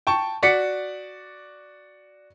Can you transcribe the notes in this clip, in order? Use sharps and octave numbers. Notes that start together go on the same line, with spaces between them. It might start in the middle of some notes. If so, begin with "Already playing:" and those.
G5 A5 C#6
F#4 D5 B6 C#7